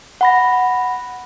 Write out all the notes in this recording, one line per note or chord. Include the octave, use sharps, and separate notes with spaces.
F#5 B5 A#6